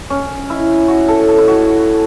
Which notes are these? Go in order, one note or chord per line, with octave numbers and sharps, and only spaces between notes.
C#4
E4
F#4
A4
A4
E4
F#4